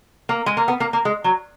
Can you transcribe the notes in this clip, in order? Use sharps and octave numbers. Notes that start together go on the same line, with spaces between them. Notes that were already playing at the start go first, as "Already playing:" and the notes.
A#3
G#3
A#3
B3
A#3
A#3
G#3
F#3